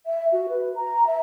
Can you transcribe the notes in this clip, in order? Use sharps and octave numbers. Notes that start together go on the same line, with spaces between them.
E5
F#4
B4
A#5
E5